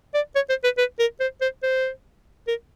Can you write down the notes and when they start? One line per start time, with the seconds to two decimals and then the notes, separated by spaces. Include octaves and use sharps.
0.14 D5
0.35 C#5
0.49 C5
0.64 B4
0.78 B4
0.99 A#4
1.20 C5
1.41 C5
1.63 C5
2.47 A#4